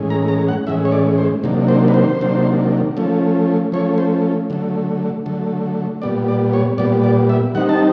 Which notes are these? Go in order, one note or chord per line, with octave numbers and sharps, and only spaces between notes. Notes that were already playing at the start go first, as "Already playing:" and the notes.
Already playing: A2 E3 G#3 C#4
A#5
A#5
F#5
A2 E3 G#3 C#4 E5
C#5
D5
C5
C3 D#3 F#3 A#3 D4
C5
B4
C5
C3 D#3 F#3 A#3 D4
F3 A3 C#4
F3 A3 C#4 C#5
C5
D3 F#3 A3
D3 F#3 A3
A#2 G3 B3 D5
D5
C#5
A#2 G3 B3 D5
D5
E5
D#3 G3 C4 D#4 F#5
A5